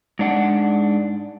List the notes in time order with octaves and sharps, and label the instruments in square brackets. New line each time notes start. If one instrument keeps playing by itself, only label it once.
[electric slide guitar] G#2 D4 F#5